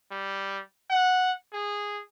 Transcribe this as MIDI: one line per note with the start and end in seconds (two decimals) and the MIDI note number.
0.11 0.61 55
0.90 1.32 78
1.53 2.00 68